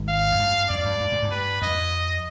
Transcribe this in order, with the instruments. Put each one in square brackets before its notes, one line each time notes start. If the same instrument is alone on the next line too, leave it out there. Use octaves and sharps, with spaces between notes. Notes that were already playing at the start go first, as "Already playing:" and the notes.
Already playing: [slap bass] G#1 G#2
[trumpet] F5
[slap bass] F2
G2
[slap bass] F2 [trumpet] D5
[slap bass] G2
G2
G#2
G2
[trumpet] B4
[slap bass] F2 [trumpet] D#5